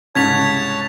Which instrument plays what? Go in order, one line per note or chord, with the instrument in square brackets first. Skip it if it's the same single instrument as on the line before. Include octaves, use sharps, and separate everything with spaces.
[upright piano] C2 G#2 C#3 [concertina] C#5 A5 [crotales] G#6 B6 F7